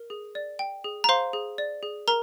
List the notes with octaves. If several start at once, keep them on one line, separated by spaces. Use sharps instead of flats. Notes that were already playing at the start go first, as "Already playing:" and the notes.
Already playing: A#4
G#4
D5
G5
G#4
A#5
C5 F5 C6
G#4
D5
G#4
A#4 A#5